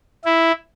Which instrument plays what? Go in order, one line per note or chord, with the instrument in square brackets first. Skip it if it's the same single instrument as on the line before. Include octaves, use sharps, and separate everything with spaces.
[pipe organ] E4